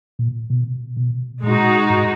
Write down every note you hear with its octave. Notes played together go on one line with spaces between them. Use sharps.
A#2
B2
B2
A#2 G#3 D#4 F#4
G#2